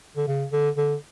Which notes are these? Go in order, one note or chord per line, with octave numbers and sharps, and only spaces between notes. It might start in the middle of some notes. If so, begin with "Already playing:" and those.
D3
C#3
D3
D3